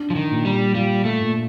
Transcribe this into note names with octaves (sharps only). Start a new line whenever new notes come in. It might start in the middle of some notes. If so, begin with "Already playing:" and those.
Already playing: D4
F3
D#3
A#2
G3
G3 F4
A3
A#2